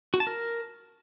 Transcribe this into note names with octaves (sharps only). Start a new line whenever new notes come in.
F#4
A5
A#4